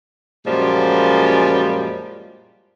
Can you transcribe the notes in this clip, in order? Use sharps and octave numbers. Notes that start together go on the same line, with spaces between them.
F#2 A#2 F3 G3 G#3